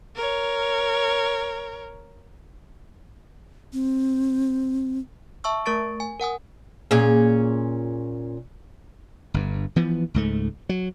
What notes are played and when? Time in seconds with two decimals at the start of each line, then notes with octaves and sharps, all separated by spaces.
0.16 A#4 C#5
3.73 C4
5.44 E5 A5 C#6 E6
5.66 A3 A#4 C#6 A6 D7
6.00 G#5
6.20 A#4 F#5 G#5 D#6
6.91 A#2 C#4 G#4
9.34 G1 G2
9.76 E3 F3 B3
10.14 C#2 G#2 A3
10.69 F#3